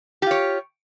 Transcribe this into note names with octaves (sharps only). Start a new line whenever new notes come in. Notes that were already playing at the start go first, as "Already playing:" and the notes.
F4 G4 C#5